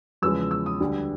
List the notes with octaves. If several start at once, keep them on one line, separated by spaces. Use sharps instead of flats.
E2 C#3 F3 G#3 E6
E6
D#6
D2 D3 G3